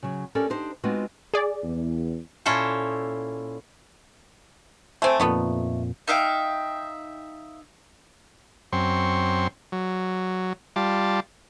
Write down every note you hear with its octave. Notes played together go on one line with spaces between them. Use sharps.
C#3 F#3
C#4 G4 A4 A#4 D5
D4 D#4 G4 C5
G#3 B3 C4 D#4 F4 F#4
G#4 D5
E2
A#2 C#4 E4 A4 C5
A3 C4 G5 G#5 C6
F2 A#2 D#3 A3 B3
D#4 E5 F5 G5
F#2 C4 C6 C#6
F#3
G3 F4 A5 D6